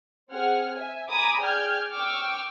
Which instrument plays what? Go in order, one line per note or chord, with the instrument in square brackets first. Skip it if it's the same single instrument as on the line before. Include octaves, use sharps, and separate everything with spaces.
[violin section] C4 G#4 F#5 F6
E5 G#5
G#5 A#5 B5 D6 D#6
G#4 D5 G5 F6 G6 G#6
G5 C#6 D6 E6 F6